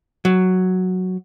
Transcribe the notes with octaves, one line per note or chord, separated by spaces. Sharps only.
F#3